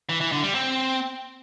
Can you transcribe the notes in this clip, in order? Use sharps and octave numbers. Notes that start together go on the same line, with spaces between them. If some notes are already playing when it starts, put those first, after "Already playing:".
E3
E3
D3
G3
C4